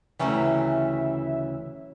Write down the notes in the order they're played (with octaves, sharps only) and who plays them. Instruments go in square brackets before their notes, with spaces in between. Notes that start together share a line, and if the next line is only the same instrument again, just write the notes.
[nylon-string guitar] D2 C#3 E3 [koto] F#3 C#4 G4 [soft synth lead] E5